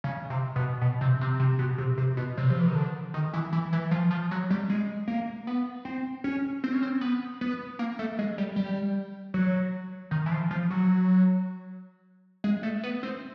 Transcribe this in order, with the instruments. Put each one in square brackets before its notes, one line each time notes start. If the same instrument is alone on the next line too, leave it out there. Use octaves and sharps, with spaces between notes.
[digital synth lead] C#3
C3
B2
B2
C3
C3
C3
B2
C3
C3
B2
C3
F3
E3
D#3
D3
D#3
E3
E3
E3
F3
F3
F#3
G3
G#3
A#3
B3
C4
C#4
C4
C#4
C4
B3
B3
A#3
A3
G#3
G3
G3
F#3
D#3
E3
F3
F3
F#3
G#3
A3
B3
C4